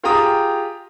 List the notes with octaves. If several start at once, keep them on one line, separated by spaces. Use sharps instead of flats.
F4 G4 G#4 G5 A#5 D#6